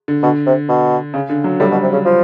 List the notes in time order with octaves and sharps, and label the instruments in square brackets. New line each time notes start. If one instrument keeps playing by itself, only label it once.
[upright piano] D3
[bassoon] B2 [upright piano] D3
[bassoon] C3
B2
[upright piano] C#3
D3
F#3
[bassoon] A2 [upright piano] G3
[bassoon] B2
C3
C#3
F3